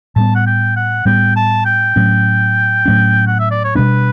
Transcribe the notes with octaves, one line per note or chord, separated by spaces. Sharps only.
A2 G3 B3 A5
F#5
G5
F#5
A2 G3 B3 G5
A5
G5
A2 F#3 A3 C#4
A2 F#3 A3 C#4
F#5
E5
D5
C#5
B2 G3 B3 D4 B4